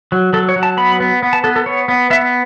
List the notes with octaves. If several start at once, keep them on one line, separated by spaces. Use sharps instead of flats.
F#3
F#3 A4
C#5
F#3
A5
B3 B5
B3
B3
A5
B3 A4
A4
B3 C#5
B3
B3 E5